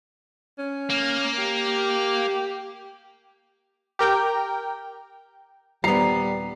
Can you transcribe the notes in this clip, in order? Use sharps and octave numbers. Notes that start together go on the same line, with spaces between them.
C#4
A#3
G4
G4 A#4 G5
D#1 G3 B3 C5 D5 A#5 C7